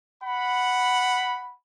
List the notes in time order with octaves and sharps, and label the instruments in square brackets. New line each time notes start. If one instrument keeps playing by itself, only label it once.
[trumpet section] F#5 B5